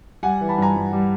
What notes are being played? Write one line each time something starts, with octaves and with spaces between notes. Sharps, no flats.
G3 F#5 G#5
E3
A5 B5
G2 G#5 A#5
G2
G3